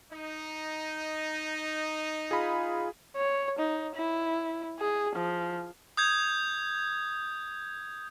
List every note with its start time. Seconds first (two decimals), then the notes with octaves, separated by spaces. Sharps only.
0.12 D#4
2.31 F4 G#4 B5
3.16 C#5
3.59 D#4
3.96 E4
4.80 G#4
5.16 F3
5.97 D#6 G6 G#6